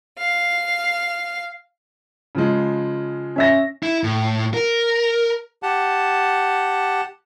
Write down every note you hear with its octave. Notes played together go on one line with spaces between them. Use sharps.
F5
C#3 F3 G#3
C#4 E5 A#6
E4
A2
A#4
G4 F#5 A5